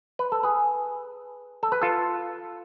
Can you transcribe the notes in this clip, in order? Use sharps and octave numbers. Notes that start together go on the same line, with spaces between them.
B4
A4
G#4 B4
A4
B4
F4 A4